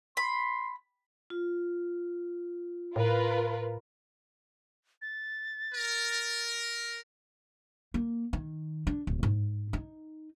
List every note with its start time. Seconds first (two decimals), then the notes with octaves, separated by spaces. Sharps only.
0.17 B5 C6
1.30 F4
2.96 A2 F4 A#4 B4
5.02 A6
5.73 A#4
7.94 A#3
8.33 D#3
8.87 D4
9.07 D1
9.23 G#2
9.73 D#4